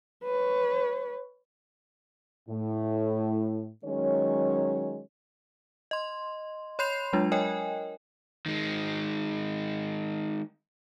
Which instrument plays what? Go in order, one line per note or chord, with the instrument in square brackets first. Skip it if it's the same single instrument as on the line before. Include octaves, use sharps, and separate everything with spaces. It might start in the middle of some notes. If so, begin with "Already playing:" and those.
[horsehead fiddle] B4 C#5
[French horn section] A2
D#3 F#3 G#3 C#4 C#5
[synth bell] D#5 C6
C#5 B5 C6 G6 C7 F7
F#3 G#3 D4 F4
A#4 C#5 D#5 G5 G#5
[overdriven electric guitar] D#3 G#3